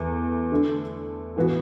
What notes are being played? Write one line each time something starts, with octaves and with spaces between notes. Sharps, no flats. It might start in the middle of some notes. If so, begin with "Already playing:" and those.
Already playing: E2 E3 A3
D3 A3 D4 A4
A2 E3 B3 F#4